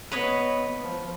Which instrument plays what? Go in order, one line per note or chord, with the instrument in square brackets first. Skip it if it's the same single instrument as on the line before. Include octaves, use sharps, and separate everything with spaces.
[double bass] B3 [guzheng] B4 C#5 D#5
[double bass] F3